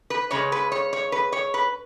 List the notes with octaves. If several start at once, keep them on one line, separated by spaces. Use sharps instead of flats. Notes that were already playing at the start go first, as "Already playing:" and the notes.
B4
C#3 G#3 C#5
B4
C#5
C#5
B4
C#5
B4